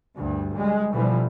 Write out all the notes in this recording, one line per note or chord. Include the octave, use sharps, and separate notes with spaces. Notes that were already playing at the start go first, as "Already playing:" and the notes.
D2 G2
G3 G#3
B2 D3 E3 F3 G3